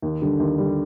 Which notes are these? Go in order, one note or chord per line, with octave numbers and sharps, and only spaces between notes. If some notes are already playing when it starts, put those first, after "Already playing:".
D#2
D3 G3
D#2
D3 G3